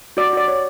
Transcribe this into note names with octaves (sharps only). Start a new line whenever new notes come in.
F#4 D5
F#4 D5
C#5